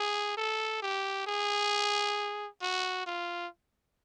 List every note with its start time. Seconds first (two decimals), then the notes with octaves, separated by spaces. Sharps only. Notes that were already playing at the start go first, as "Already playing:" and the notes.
Already playing: G#4
0.37 A4
0.82 G4
1.27 G#4
2.62 F#4
3.06 F4